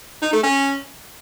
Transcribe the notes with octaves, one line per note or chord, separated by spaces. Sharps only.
D#4
A3
C#4